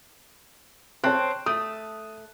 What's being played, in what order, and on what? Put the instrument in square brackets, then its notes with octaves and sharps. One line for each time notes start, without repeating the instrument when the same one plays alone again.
[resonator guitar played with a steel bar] C4 [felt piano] C#5 A5 F#6
[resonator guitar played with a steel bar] A3 [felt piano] D#6